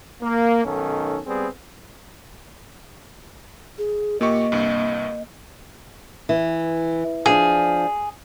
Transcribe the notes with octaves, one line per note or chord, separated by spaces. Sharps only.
A#3
B1 D#3 C#4 A4
G3 B3 C4 G#4
G#4
A#2 A#3 G4 D#5 C#6
C2 G2
E3
F3 D4 G#4